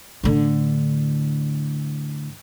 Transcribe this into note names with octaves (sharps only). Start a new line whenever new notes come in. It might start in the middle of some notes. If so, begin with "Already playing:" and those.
A2 D3